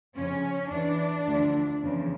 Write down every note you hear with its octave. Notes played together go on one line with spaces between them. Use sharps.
F2 C#3 F3 C#4
E2 E3 D4
D2 D3 F3
E2 C#3 F3